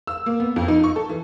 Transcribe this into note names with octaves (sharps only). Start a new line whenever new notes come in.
E6
A#3
B3
F2
D#4
C#6
A4
E3